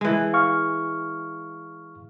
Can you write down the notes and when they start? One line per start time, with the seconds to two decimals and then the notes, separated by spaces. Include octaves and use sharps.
0.01 E3 G#3
0.33 F5 C#6 F6